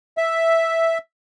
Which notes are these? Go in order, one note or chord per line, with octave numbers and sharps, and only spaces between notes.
E5